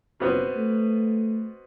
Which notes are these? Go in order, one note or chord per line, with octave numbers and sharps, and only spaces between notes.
F#1 B2 B3 C4
A3